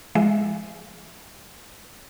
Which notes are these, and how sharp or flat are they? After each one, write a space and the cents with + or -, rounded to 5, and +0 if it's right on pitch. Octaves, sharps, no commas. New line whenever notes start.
F3 -40 G#3 +0 E5 +0